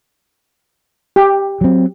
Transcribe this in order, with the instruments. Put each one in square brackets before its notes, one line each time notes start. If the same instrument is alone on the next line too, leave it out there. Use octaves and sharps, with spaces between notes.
[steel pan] G4
[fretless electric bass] F#3 C4